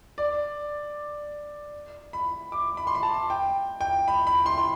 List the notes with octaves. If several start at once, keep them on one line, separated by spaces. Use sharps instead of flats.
D5
B5
D6
B5
C6
B5
A5
G5
G5
B5
B5
C6
C6